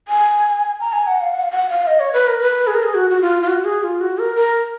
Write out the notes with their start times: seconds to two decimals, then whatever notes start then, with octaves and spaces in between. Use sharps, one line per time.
0.08 G#5
0.80 A#5
0.93 G#5
1.07 F#5
1.21 F5
1.34 F#5
1.43 F5
1.51 F#5
1.69 F5
1.87 D#5
2.00 C#5
2.13 B4
2.28 A#4
2.41 B4
2.67 G#4
2.75 A#4
2.83 G#4
2.94 F#4
3.10 F#4
3.21 F4
3.43 F4
3.48 F#4
3.64 G#4
3.83 F4
4.01 F#4
4.18 A#4
4.36 A#4